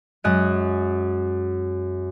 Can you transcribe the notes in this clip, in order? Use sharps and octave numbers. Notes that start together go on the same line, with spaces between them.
F#2 G#3 D#5 F#6 D#7